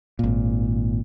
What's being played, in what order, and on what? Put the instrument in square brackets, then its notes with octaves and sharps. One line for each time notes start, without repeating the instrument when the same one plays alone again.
[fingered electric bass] G#1 A#2